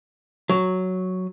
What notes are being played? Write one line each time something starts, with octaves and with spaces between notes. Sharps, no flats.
F#3